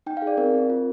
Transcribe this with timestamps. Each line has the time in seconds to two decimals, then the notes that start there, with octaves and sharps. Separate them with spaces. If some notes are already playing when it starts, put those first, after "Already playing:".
0.06 D#4 G5
0.17 F5
0.22 G#4
0.27 D5
0.37 C4 A#4
0.54 C4
0.70 F4